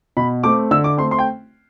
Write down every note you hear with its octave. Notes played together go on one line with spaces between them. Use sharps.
B2 B5
A3 C4 D6
D3 E6
D6
A3 C4 C6
C6
G5